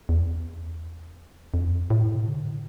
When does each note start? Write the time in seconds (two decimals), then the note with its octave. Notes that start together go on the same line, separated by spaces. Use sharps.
0.09 E2
1.54 F2
1.90 A2
2.15 C3
2.27 D3